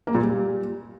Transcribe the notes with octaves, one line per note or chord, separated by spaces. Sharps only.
A#3
A#2
G3